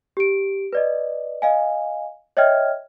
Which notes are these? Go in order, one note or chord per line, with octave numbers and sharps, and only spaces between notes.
G4 D7
B4 D5 D#5
D#5 F5 G#5
C#5 D#5 E5 G5 F6 G#6